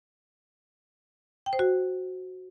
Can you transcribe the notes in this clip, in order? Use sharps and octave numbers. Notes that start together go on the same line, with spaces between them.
G5
C5
F#4